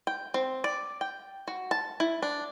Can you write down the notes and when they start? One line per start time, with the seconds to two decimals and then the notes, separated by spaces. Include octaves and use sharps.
0.07 G5
0.34 C4
0.64 D5
1.01 G5
1.48 F#4
1.71 A5
2.00 E4
2.22 D4